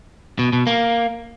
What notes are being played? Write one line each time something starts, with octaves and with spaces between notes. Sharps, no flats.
B2
B2
A#3